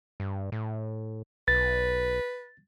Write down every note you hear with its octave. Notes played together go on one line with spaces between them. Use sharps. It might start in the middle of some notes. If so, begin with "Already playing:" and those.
G2
A2
B1 B4 A6